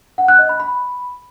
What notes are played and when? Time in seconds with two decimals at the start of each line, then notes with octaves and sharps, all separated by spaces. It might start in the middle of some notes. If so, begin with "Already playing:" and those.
0.18 F#5
0.28 F#6
0.39 D#5
0.49 B5
0.60 B5